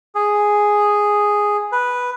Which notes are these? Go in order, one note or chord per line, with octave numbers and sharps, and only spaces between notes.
G#4
B4